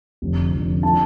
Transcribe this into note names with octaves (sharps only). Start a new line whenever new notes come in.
F1 F2 D3
F1 F2 D3
D3 F3 A5